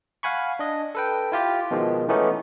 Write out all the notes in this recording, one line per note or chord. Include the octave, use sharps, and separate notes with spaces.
F5 F#5 G#5 B5 C#6
D4 D#5
A4 B4 G5
E4 F4 G4
B2 D#3 F3 G#3
E3 A3 B3 C#4 D#4